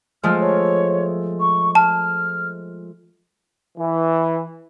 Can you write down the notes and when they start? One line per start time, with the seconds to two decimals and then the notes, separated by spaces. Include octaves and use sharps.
0.23 F3 G#3 A3 F6
0.40 C#5
1.40 C#6
1.75 A5 F6
3.77 E3